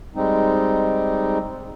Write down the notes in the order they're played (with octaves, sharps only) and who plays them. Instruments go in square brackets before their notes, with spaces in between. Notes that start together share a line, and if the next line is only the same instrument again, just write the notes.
[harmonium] G3 G#3 C4 D#4